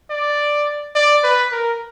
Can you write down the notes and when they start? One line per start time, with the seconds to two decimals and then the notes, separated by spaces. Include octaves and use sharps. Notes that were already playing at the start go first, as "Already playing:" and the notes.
0.10 D5
0.95 D5
1.23 B4
1.52 A#4